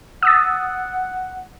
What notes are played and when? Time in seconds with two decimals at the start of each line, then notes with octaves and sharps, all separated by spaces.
0.23 F#5 D#6 E6 A6